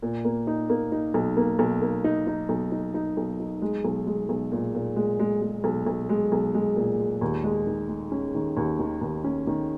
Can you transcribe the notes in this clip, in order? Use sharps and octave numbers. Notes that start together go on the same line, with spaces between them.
A#2
A#3
D#4
A#3
D#4
B1
A#3
B1
A#3
D#4
D#4
B1
D#4
D#4
B1
D#4
G#3
B1
G#3
B1
A#2
A#2
G#3
G#3
G#3
B1
B1
G#3
B1
G#3
A#2
G#3
D#2
G#3
D#3
G#3
C#4
D#3
D#2
D#3
D#2
C#4
D#3